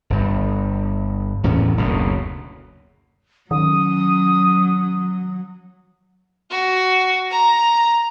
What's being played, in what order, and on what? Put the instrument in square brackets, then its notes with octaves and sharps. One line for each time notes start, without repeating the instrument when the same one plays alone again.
[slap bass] G1 G2
E2 A2 C3 C#4
F#1 D2 B2
[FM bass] D#3 [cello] F#3 [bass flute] C#4 [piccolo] D#6
[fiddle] F#4
A#5